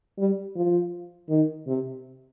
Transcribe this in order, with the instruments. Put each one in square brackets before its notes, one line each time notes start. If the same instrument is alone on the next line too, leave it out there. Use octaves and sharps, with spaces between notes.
[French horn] G3
F3
D#3
C3